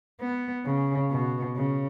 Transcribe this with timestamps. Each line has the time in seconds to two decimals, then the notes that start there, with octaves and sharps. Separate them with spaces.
0.21 B3
0.65 C#3
1.11 B2
1.56 C#3